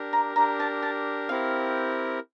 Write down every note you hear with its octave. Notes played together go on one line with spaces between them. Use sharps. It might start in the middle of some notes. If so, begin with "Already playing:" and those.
Already playing: D4 G4 A#4
A#5
D4 G4 A#4 A#5
A5
A5
C4 E4 G4 A#4 F5